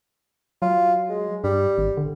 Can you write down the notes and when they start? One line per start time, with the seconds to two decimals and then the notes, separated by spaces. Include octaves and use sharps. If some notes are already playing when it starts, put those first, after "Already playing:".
0.62 F#3 F4
1.09 G#3
1.44 G2 G3
1.78 G#1
1.97 D3